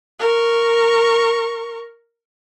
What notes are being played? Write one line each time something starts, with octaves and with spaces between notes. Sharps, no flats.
A#4 C#6